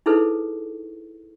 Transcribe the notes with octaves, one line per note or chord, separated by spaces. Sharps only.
D#4 E4 G#4 A4 B4 C5